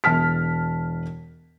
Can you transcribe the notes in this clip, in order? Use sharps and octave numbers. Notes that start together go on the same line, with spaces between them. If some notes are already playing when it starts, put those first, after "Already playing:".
E1 A5 F6 B6